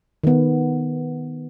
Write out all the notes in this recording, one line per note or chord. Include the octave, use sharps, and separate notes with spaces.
D#3 B3